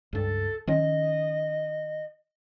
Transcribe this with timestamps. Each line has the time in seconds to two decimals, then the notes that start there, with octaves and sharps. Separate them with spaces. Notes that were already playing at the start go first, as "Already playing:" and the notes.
0.13 C#2 G2 A4
0.67 D#3 F3 C#4 D#5